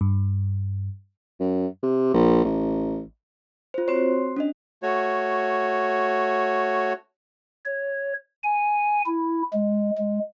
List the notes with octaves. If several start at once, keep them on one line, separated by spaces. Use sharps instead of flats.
G2
F#2
C3
A#1
A1
F4 C5
C4 F#4 C5 C#5 C6
C#4 D4 D#5
A3 F#4 C#5
C#5
G#5
E4
G#3
G#3